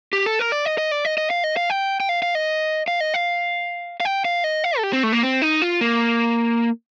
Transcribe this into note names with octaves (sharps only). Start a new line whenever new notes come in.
G4
A4
A#4
D5
D#5
D#5
D5
D#5
D#5
F5
D#5
F5
G5
G5
F5
F5
D#5
F5
D#5
F5
F5
G5
F5
D#5
F5
A4
G4
C4
A3
A#3
C4
D#4
F4
A#3